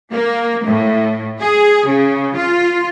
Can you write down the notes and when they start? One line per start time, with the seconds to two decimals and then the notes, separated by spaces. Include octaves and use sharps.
0.12 A#3
0.65 A2
1.40 G#4
1.87 C#3
2.36 F4